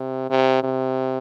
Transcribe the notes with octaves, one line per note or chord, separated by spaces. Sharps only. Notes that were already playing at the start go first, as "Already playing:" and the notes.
Already playing: C3
C3
C3